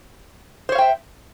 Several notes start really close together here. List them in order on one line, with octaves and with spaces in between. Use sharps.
C5 C#5 F5 G5 E5